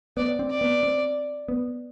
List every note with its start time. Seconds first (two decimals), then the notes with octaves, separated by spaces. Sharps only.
0.17 B3 D5
0.39 C4
0.50 D5
0.61 B3
0.83 C4
1.48 B3